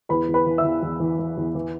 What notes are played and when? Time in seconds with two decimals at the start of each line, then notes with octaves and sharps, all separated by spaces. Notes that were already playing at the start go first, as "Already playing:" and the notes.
0.09 E2 B4 B5
0.28 E2
0.34 B4 B5
0.47 E3
0.58 E5 E6
0.64 E2
0.83 E2
1.00 E3
1.19 E3
1.37 E2
1.55 E3